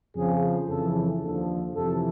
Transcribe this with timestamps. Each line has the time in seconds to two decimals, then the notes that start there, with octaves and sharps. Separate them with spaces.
0.15 F2 C#3 F3 G#4
0.69 F2 C#3 E3 A4
1.22 D#2 D3 F3 A4
1.74 F2 C3 E3 A4